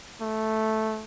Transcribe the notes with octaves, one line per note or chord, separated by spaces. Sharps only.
A3